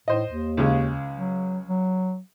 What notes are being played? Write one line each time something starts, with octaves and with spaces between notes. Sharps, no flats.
A2 C5 D#5
D#2
C#2 C#3 G#3
F#3
F#3